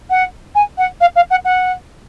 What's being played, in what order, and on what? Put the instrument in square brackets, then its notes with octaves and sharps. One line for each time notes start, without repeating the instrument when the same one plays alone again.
[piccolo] F#5
G#5
F#5
F5
F5
F#5
F#5